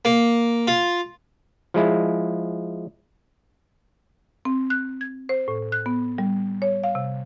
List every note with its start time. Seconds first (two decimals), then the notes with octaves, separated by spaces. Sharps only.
0.05 A#3
0.67 F4
1.74 F3 G#3 E4
4.45 C4
4.70 F#6
5.01 G#6
5.29 C5
5.48 A2
5.72 F#6
5.86 B3
6.18 G3
6.62 C#5
6.84 F5
6.95 C3